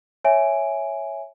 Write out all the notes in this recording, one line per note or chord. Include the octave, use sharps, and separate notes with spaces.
C#5 E5 G#5 D7